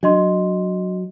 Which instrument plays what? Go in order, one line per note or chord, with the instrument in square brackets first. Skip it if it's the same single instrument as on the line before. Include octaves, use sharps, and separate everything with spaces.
[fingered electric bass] F#3 [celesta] D4 D#5 C6